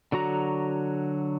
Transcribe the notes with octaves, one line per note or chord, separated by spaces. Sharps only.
D3 F#3 F#4 A#5